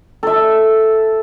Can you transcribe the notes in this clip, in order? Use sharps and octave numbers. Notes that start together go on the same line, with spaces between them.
A4 E5